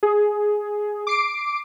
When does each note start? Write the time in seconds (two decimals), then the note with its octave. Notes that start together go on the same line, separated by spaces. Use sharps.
0.03 G#4
1.07 D6 C7 D7